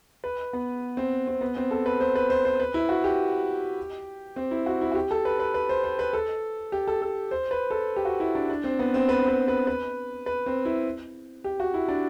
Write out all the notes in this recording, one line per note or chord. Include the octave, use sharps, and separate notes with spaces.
B4
B3
C4
C4
B3
C4
A4
B4
C5
B4
C5
C5
B4
E4
F#4
G4
C4
E4
F#4
E4
F#4
G4
A4
B4
B4
B4
C5
C5
B4
A4
G4
A4
A4
C5
B4
A4
G4
F#4
E4
D4
D4
C4
B3
C4
B4
C5
B4
B4
B4
B4
C4
E4
G4
F#4
E4
D4